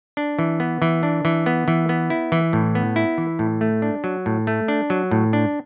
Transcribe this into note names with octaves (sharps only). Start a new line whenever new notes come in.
D4
E3
B3
E3
D4
E3
B3
E3
B3
E4
E3
A2
B3
E4
E3
A2
A3
D4
F#3
A2
A3
D4
F#3
A2
D4